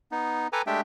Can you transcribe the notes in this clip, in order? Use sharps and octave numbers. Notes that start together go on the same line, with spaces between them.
B3 D#4
A4 B4 G5 G#5 A#5 D6
G#3 A3 D4 G4 E5 G5